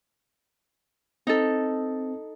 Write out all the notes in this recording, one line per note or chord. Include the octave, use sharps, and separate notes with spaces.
C4 D#4 A4